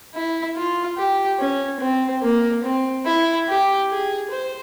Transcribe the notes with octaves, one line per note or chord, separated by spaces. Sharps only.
E4
F4
G4
C#4
C4
A#3
C4
E4
G4
G#4
C5